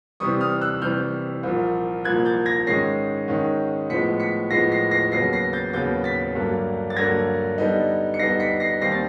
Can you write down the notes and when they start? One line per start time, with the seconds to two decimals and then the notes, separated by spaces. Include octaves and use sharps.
0.20 C3 E3 G3 C#6 D#6
0.41 D#6 F6
0.61 E6 F#6
0.82 C3 E3 G3 F6 G6
1.43 C2 A#2 F3 A#3
2.05 C2 A#2 F3 A#3 F#6 G#6
2.25 G6 A6
2.46 G#6 A#6
2.67 G#2 D#3 G#3 C#4 A#6 C7
3.28 G#2 D#3 G#3 C#4
3.90 A2 F3 G#3 B3 B6 C#7
4.20 B6 C#7
4.50 A2 F3 G#3 B3 A#6 C7
4.72 A#6 C7
4.91 A#6 C7
5.12 D#2 C#3 F#3 B3 A#6 C7
5.33 A#6 C7
5.53 G6 A6
5.73 D#2 C#3 F#3 B3 G6 A6
6.04 A6 B6
6.35 G2 D3 F#3 A#3
6.90 A6
6.96 G2 D3 F#3 A#3 G#6 A#6
7.58 D3 G3 B3 D#4
8.14 C#7
8.19 D3 G3 B3 D#4 A#6 C7
8.40 B6 C#7
8.60 A#6 C7
8.81 D#2 D#3 G3 C4 A#6 C7
8.92 A6